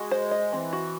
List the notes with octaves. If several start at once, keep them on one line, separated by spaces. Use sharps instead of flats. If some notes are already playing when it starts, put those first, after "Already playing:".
Already playing: G#3 F#4
C5
D#5
E3 C4
F#4